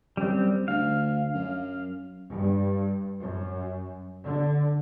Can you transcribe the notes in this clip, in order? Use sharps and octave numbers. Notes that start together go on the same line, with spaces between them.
F#2 G3 C4
D2 F5
F#2
G2
F#2
D3